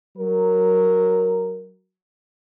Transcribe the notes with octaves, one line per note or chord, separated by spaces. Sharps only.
F#3 A#4